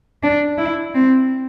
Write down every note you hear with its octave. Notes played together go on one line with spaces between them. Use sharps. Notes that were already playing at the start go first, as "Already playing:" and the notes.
D4
E4
C4